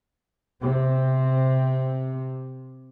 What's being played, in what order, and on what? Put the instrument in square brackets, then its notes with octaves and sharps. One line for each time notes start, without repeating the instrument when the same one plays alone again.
[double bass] C3 C4